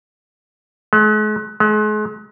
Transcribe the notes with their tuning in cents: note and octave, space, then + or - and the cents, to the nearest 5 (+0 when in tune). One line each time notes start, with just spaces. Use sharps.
G#3 +45
G#3 +40